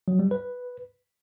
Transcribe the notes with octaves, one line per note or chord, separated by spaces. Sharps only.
F#3
G3
B4